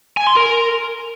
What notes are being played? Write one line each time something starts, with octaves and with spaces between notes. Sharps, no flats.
G#5
C6
A#4